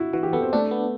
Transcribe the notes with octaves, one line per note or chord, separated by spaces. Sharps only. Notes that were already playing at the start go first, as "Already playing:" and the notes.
Already playing: E4 F#4
E3 F#4
G4
B3 A4
C4
A3 D4
B3